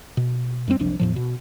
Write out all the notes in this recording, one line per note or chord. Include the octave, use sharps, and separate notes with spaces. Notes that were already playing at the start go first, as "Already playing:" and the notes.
B2
F#2 G3 G#3 C4
F#1 C2 F3 D4
E2 A2 F3
B2